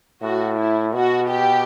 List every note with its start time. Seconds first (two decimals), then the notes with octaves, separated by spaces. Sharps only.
0.22 A2 F#4
0.58 E4
0.94 B2 F#4
1.29 G4